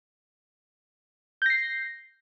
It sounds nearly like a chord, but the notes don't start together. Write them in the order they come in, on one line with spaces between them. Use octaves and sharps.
G6 A#6 C7